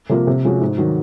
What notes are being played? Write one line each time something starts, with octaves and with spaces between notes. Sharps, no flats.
C3 F3 A#3
C3
F3 G#3 C#4 F#4
G#2
D#3 F#3